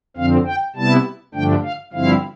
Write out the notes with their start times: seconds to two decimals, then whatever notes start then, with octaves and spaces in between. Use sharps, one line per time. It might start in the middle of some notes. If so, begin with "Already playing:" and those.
0.17 F2 D3 F3 C4 F5
0.47 G5
0.76 C3 G3 B3 E4 A5
1.34 G2 D3 F3 A3 D4 G5
1.64 F5
1.93 G2 D3 F3 C4 E4 F5